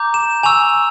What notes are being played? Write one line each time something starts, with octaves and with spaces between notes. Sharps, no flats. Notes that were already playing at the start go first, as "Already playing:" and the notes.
Already playing: A#5 D6 G6
E7
G#5 C#6 E6 F7